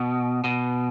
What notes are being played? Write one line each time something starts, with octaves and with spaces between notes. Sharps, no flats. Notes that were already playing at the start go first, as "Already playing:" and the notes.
Already playing: B2
B2